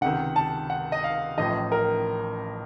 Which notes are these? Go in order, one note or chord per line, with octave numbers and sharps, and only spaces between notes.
C#2 C3 D#3 F#5
A5
F#5
D#5
F5
A1 A2 F3 D#5
A#4